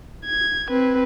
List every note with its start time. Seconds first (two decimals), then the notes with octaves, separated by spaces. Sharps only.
0.25 G#6
0.70 C4 B4